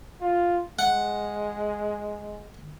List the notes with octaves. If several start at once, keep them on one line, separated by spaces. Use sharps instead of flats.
F4
G#3 F#5